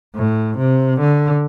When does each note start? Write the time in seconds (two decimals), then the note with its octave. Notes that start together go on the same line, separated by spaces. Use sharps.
0.15 A2
0.58 C3
1.00 D3